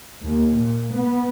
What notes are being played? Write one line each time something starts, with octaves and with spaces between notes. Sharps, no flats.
D#2
A#2
B3